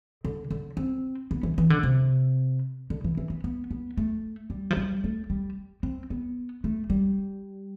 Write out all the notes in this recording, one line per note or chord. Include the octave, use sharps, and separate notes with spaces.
D3
D3
C4
B3
E3
E3
D3
C3
D3
E3
E3
B3
B3
B3
A3
G3
F3
G3
A3
G3
C4
B3
A3
G3